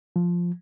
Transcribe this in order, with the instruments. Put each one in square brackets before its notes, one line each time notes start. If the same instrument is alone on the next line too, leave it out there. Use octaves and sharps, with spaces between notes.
[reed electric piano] F3